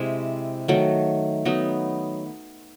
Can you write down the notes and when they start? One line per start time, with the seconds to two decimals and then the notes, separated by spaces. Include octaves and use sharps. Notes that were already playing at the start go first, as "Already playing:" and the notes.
Already playing: C3 G#3 C4 E4
0.68 D#3 F#3 A3
1.45 F#3 B3 D#4